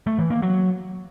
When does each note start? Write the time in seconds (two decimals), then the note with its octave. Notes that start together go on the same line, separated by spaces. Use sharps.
0.07 A3
0.19 E3
0.30 A#3
0.42 F#3